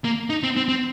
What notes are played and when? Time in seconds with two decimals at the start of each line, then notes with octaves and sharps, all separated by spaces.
0.04 A#3
0.30 D#4
0.43 C4
0.57 C4
0.69 C4